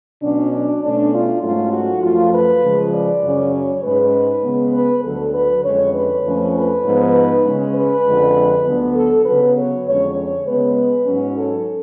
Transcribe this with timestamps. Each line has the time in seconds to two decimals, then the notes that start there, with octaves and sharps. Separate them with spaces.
0.22 B2 F#3 C#4 D4
0.52 D4
0.81 B2 A3 C#4 D4
1.12 F4
1.42 G#2 F#3 A3 C#4 F4
1.72 F#4
2.02 F#2 F3 A3 F4
2.33 B4
2.63 C#3 F3 G#3
2.93 D5
3.23 F#2 C#3 F#3 C#4
3.53 C#5
3.83 G#2 G#3 C#4 B4
4.43 C#3 G#3 B3
4.74 B4
5.03 D2 D3 F#3 A4
5.34 B4
5.64 F2 D3 G#3 C#4 C#5
5.94 B4
6.25 F2 F3 A3 C#4
6.54 B4
6.85 G#2 F3 B3
7.45 C#3 G#3 C#4
7.75 B4
8.05 F2 D3 G#3
8.66 D2 D3 F#3 B3
8.96 A4
9.25 C#3 F#3 B3 B4
9.56 C#5
9.86 F2 D3 G#3 C#4 C#5
10.16 C#5
10.47 C#3 G#3 B3 B4
11.06 G#2 F#3 C#4
11.37 A4